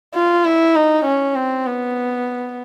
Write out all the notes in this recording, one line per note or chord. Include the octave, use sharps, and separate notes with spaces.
F4
E4
D#4
C#4
C4
B3